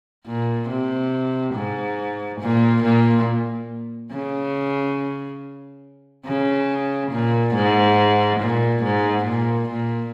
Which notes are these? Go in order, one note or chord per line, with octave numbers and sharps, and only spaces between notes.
A#2
C3
G#2
A#2
A#2
C#3
C#3
A#2
G#2
A#2
G#2
A#2
A#2